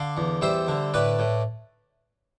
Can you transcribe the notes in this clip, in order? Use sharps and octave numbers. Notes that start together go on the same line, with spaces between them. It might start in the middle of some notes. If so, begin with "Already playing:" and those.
Already playing: D3 D5 F5
E2
G3 C5 E5
D3
A2 B4 D5
A2